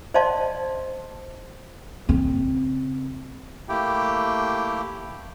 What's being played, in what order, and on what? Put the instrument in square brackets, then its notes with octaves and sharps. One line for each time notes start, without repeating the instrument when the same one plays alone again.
[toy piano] C5 D5 D#5 F5 A5 C6
[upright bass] C#3 C4
[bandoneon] A3 A#3 E4 G4 G5